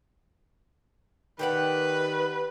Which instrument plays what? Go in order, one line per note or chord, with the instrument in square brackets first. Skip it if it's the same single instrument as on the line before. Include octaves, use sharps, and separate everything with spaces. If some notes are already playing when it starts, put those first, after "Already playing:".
[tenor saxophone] D#3 [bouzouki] G4 D5 F#5 [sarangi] B4